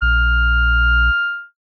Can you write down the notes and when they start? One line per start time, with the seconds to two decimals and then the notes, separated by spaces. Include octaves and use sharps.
0.02 A#1 F6